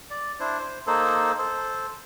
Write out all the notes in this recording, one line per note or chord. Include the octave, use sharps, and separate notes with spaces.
D5
D4 E4 C5
C5
A#3 D#4 A4 C5
A4 C5